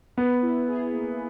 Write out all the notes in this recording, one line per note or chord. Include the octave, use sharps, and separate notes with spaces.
B3 B4
E4
G#4
A#3